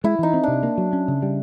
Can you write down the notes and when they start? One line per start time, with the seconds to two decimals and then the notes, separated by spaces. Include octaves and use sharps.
0.04 G#3 E4
0.19 E3 D#4
0.34 C4
0.43 C3 D4
0.63 A#3
0.78 F#3
0.93 C#4
1.08 C#3
1.22 G3